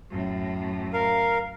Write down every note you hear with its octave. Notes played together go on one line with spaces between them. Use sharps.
F#2 A2
A#4 F5